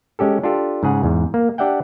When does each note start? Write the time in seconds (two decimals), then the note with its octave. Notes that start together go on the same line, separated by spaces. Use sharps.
0.19 G#3 C#4 G4 A4
0.43 D4 F4 G4 A4
0.83 G#2 C#3 G#4 F#5
1.03 E2 G#2
1.34 A#3
1.58 D4 G4 D5 E5 F#5 G5